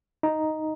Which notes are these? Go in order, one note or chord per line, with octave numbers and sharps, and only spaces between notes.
D#4